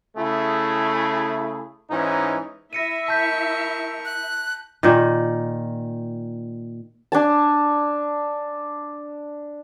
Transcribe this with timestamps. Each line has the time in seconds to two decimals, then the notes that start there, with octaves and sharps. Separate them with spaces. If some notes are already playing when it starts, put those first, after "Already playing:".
0.17 C#3 A3 E4 G#4
1.91 G#2 E3 C#4 D#4
2.73 E4 E5 A#6 C#7 D#7
3.08 A#4 A5 C#6 G6 B6
4.05 F#6
4.83 A#2 D#3
7.12 D4 G#5 A5